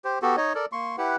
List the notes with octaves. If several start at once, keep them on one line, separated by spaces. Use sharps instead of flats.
G4 C5
B3 F#4 G4 A4
D#4 C#5 D#5
A4 A#4 D5
A#3 C6 C#6
E4 G4 B4 F#5